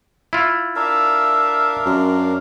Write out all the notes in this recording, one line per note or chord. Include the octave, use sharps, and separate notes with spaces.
E4 F4
D4 A#4 E5 F5
F#2